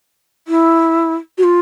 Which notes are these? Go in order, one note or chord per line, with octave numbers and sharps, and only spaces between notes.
E4
F#4
F4